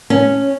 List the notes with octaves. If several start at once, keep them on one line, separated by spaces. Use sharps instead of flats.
C#4